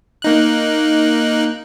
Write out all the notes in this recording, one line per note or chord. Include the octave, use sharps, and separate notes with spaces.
A#3 D#4 F#6